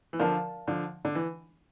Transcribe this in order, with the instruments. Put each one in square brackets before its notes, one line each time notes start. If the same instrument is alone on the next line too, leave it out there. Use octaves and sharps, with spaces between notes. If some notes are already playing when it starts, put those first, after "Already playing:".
[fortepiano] E3
[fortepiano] D3 F3 [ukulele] A#4 D5 F5 A5
[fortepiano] D3 F3
D3
E3